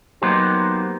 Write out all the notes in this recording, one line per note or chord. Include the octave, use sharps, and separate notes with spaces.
F#3 A#3 B3 D#4 G4 C5